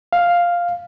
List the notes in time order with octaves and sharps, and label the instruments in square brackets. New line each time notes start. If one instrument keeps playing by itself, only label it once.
[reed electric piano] F5